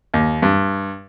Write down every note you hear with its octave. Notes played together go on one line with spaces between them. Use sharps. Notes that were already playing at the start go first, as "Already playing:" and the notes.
D#2
G2